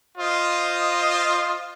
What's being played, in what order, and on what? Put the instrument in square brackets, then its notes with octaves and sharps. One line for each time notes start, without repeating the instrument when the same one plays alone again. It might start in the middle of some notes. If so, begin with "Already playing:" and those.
[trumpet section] F4 C5 D#5